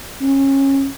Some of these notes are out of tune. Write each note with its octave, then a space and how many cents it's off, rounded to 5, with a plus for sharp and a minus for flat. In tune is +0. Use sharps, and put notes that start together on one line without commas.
C#4 -25